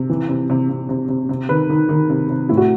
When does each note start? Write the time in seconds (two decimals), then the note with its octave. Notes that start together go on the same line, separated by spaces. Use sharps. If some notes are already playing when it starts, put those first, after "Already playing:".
Already playing: C3
0.10 E3
0.29 C3
0.50 C3
0.69 C3
0.89 C3
1.09 C3
1.29 C3
1.49 D#3 B4
1.70 D#3
1.89 D#3
2.10 C3
2.30 C3
2.49 A2 E4
2.57 F#4